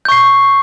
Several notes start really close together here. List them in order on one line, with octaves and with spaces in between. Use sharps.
G6 C#6 C7